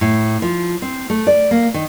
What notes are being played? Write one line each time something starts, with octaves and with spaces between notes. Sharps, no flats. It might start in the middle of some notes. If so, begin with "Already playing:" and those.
A2
F3
C4
A3
D5
A#3
D#3